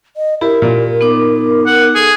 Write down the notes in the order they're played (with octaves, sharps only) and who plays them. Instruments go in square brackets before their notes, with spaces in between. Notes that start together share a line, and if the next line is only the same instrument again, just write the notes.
[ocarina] D#5
[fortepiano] E4 [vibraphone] G4 [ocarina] A#4
[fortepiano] A#2
[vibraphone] B3 D#4 D6
[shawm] F#5
[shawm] G#4 [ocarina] A4